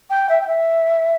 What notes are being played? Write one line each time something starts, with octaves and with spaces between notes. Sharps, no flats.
G5
E5
G5
E5